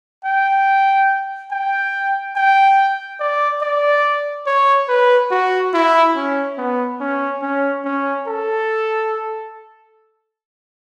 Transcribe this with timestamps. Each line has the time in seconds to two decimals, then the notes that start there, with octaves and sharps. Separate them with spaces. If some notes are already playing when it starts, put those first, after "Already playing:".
0.25 G5
1.51 G5
2.36 G5
3.20 D5
3.62 D5
4.46 C#5
4.89 B4
5.31 F#4
5.74 E4
6.16 C#4
6.58 B3
7.01 C#4
7.42 C#4
7.85 C#4
8.27 A4